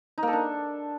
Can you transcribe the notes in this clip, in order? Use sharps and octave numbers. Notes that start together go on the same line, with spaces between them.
D#4
A#3
A4
D4